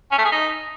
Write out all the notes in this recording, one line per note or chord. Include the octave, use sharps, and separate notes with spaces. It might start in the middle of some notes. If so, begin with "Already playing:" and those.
C#4
A3
G#4
D#4